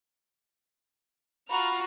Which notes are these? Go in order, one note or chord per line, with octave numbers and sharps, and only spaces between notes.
F4 F#4 A#5 B5 F6